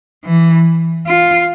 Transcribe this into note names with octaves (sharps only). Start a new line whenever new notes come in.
E3
F4